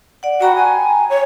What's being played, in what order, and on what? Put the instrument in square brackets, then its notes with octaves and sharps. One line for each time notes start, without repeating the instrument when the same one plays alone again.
[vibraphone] D5 F#5
[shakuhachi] F#4 [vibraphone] G5 A#5 B5
[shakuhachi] G#5
C#5